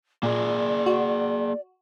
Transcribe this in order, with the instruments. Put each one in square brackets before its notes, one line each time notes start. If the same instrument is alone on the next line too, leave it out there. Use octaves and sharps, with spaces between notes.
[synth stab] A#2 [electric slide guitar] A#3 G#4 [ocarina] D5
[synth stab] F#4